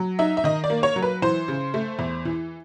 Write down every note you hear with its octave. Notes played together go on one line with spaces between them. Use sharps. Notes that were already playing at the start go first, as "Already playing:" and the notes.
Already playing: F#3
D#4 E5
E5
D#3 D#5
D5
A#3
C#5
F#3
B4
E3 C5
C#3
A3
E2
E3